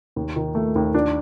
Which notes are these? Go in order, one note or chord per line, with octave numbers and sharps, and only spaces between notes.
D#2
D#3
A3
D#2
D4